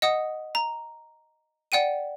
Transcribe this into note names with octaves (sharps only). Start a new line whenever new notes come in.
D#5 F#5 D#6
A#5
D5 F#5 G5 D#7